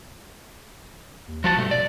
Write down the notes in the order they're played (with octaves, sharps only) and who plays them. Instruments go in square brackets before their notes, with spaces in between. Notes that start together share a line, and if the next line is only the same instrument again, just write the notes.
[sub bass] D#2
[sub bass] A1 [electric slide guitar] F3 F#4 A5
[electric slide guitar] G2 A3 [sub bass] B2
[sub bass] D#1 [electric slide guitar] D5